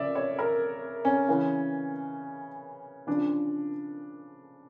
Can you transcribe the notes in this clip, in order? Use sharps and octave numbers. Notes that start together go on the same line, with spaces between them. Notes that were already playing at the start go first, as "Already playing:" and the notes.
Already playing: C#3 F3 D5 E5
C#5
A#4
C#4
C#3 E3
C#3 F3 D4